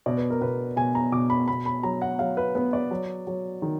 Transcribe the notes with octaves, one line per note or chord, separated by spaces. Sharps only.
B2 D5
B4
A#4
B2 B4
B2 G#5
A#5
B2 D6
B5
B2 B5
B5
F#3 A#5
F#5
F#3 F5
B4
B3 B4
D5
F#3
F#3
D#3